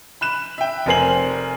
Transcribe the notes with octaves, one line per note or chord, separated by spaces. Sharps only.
B5 F#6 E7
E5 G5
F1 A#4 C5 G#5 C7 F#7